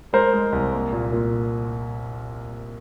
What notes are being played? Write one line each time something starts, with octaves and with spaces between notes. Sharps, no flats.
G#3 A#4 C5
G#3
C2
A#3
A#2
A#2